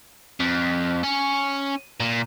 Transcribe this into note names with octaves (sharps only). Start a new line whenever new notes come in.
F2
C#4
A#2